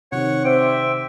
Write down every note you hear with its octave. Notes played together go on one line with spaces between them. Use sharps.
C3 D#3 C#5 F#5
C4 C5 D5 E5 G5